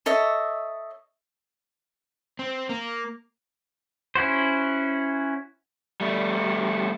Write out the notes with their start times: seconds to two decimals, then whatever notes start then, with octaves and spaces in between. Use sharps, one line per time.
0.06 A4 C#5 D#5 E5
2.39 C4
2.69 A#3
4.15 C#4 E4 F#4 C5
6.01 G3 A3